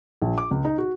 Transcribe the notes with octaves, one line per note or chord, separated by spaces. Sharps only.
A#1
D6
C#2
D#4
F#4